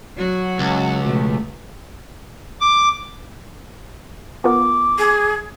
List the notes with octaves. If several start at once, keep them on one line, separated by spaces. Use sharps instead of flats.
F#3 F#4
C#2
B2 F3 A3
D6
B3 F4 A#4 D6
G#4